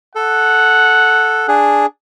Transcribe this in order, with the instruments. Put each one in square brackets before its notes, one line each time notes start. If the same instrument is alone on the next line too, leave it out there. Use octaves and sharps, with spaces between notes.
[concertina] A4 [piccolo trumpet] F#5
[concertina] D4 G#4